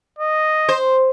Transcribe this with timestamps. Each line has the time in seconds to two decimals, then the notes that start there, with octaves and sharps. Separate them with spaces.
0.19 D#5
0.69 C5